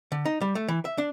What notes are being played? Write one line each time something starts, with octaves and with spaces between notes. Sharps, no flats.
D3
D#4
G3
A3
E3
E5
D4